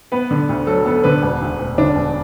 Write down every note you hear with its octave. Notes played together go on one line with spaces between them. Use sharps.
B3 B4
D3
D2
F#3 A4
B3 A4
D3 B4
E1
D2
E1
D3 D4
E1